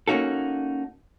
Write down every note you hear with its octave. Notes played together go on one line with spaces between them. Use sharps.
A#3 C#4 D#4 F#4 A4